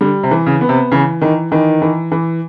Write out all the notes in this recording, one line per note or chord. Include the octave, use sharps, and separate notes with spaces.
D3 G3
C3
E3
C#3
B3
C3
C#3 E3
D#3 E3
D#3 E3
E3
E3